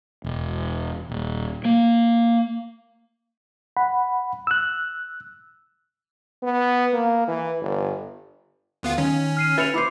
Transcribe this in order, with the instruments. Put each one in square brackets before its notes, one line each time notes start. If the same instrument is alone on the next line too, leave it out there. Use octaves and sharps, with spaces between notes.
[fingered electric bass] E1
D#1
A#3
[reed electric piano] F#5 B5
E6 F#6
[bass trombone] B3
A#3
E3
G1
[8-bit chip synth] D2 B3 F4
[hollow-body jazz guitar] D#3 [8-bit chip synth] C#4
[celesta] F6 C7 D#7
[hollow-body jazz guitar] B4 E5 [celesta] A6 C#7 F7
[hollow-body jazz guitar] E4 C5 [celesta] B5 D6 C7